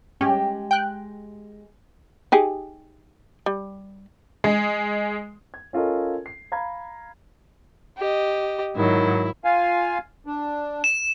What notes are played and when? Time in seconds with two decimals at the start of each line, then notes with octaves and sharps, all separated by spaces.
0.21 G#3 C#4 G4
0.71 G5 F#6
2.32 D#4 G4 G#4
3.46 G3
4.44 G#3
5.54 G#6
5.73 C#4 F4 A4 A#4 D#5
6.26 C7
6.52 F5 A#5 B5 G#6
7.97 G4 D#5
8.76 G#2 D#3 F#3 E4
9.44 F4 F5 G#5
10.26 D4
10.84 E7